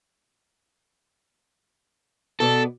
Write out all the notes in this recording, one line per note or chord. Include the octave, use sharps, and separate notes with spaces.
B2 B3 A4 D5